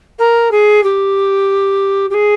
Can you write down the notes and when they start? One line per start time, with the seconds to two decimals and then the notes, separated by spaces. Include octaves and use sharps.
0.18 A#4
0.51 G#4
0.83 G4
2.10 G4
2.14 G#4